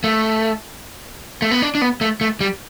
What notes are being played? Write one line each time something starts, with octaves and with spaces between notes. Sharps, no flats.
A3
A3
B3
D4
D4
B3
A3
A3
G3